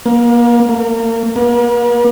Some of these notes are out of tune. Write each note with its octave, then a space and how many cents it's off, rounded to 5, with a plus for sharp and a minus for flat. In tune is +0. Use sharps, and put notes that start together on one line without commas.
A#3 +30
A#3 -35
A#3 +45